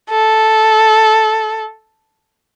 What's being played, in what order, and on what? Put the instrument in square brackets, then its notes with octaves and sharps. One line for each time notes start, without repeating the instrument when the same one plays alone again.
[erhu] A4